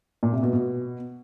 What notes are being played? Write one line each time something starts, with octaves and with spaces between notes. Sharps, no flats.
A#2
C3
B2
B2